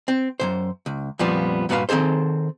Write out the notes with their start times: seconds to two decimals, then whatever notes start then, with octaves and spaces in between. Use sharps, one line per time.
0.08 C4
0.40 F#2 A#2 C5
0.86 C#2
1.19 F2 A#2 F3 G3 B3
1.69 G2 A#2 F#4 G#4 B4 F5
1.89 D#3 C4 G#4 A4 C5